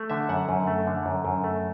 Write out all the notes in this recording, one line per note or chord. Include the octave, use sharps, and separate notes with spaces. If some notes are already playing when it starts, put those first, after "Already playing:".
Already playing: A3
D3 E5
F#2 F#5
F#2
A3
D3
F#2
F#2
A3